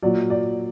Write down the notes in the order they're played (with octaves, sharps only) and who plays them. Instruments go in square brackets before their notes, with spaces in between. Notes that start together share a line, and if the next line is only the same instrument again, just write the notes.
[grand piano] A#2 F#3 D5
D5